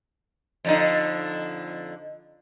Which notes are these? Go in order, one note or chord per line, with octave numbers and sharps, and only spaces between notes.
F2 D3 D#4